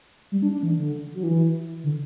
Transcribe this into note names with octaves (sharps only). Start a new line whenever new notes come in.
G3
D4
D4
E3
D3
F#3
E3
D3